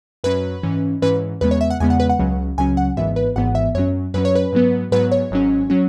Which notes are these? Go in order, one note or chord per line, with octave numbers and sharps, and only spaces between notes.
F#2 F#3 C#4 B4
G#2 E3 C#4
G#2 E3 C#4 B4
E2 C#3 G#3 B3 B4
C#5
E5
F#5
E2 C#3 G#3 B3 G#5
F#5
B4
F#5
C#2 C#3 F#3 C#4
C#2 C#3 F#3 C#4 G#5
F#5
G#1 G#2 E3 B3 E5
B4
G#1 G#2 E3 B3 F#5
E5
F#2 F#3 C#4 C#5
F#2 F#3 C#4 B4
C#5
B4
G#2 F#3 B3
G#2 F#3 B3 B4
C#5
G#1 G#2 F#3 C#4
F#3 C#4